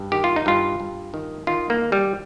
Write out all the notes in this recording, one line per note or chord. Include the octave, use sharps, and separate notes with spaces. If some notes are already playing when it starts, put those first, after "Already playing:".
Already playing: G2
D#3 G4
F4
D#4
G2 F4
G2
D#3
D#3 F4
A#3
D#3
G3